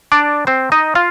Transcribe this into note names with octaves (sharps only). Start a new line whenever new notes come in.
D4 D5
C4 C5
D#4 D#5
F4 F5